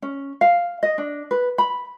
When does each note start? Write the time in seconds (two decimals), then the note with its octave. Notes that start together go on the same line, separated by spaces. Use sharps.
0.02 C#4
0.41 F5
0.83 D#5
0.98 D4
1.31 B4
1.58 B5